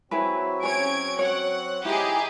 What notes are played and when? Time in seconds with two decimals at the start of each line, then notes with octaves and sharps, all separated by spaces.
0.11 F#3 C4 E4 F#4 G#4 B4
0.63 C#4 G#4 C#5 G#6 D7
1.19 C#5 F#5
1.85 E3 D#4 E4 G4 G#4 D#5 E5